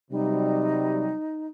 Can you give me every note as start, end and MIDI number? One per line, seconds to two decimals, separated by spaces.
0.11 1.13 48
0.11 1.13 54
0.11 1.13 55
0.11 1.47 63